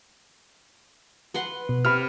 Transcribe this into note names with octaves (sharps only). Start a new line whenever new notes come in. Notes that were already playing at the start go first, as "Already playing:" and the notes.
B4 F#5 C6
B2
C3 B5 F6